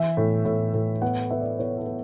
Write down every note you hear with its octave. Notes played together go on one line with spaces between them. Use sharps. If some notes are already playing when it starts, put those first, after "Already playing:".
Already playing: E3 E5
A2
A2
A2
B3 F#5
B3 E5
D5
B3 C#5
A4
B3